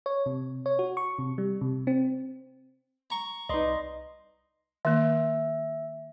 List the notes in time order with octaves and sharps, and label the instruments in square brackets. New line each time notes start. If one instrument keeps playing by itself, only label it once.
[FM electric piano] C#5
C3
C#5
F#4
C#6
C3
G3
C3
C4
[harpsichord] A#5 C#6
[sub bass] C2 [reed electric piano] D#4 B4 D5 [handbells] D#5 C6
[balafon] D#3 A#3 [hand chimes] E5